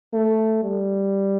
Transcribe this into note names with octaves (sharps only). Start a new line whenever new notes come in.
A3
G3